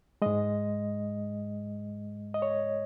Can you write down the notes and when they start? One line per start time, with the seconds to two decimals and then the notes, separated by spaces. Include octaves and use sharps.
0.22 G#2 G#3 D#5
2.34 D#5
2.42 C#5